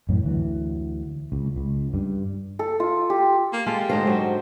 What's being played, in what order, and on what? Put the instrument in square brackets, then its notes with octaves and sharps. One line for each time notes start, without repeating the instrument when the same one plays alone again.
[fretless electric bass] F#2 A2 E3 C#4
D2 E3 F#3
C#2
C#2
G2
[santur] A4
F4
G4
[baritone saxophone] A#3
[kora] G#3 F4 A4 [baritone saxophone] G4
[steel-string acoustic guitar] G#2 C5 [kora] D3 D#5 F5
[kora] F#3